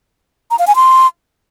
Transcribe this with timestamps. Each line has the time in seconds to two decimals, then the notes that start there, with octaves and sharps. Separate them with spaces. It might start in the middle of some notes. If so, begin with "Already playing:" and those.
0.51 A#5
0.59 F5
0.67 G#5
0.76 C6